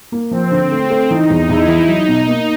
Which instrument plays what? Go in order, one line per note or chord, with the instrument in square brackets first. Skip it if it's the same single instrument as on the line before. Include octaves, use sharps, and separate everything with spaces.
[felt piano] A#3
[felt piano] F3 [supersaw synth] C4
[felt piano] D3
A3
A3
[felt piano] E3 [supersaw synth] D#4
[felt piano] E2
[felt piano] E2 [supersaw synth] E4
[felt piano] E3
[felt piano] F#3 [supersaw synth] D#4
[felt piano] B2
A#3